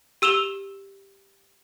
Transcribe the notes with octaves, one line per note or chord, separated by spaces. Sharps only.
G4 E6 E7 F7 G7